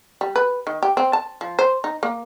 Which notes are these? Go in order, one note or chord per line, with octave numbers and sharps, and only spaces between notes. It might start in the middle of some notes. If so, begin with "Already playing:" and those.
G3
B4
D#3
G4
C4
A5
F3
C5
D#4
A#3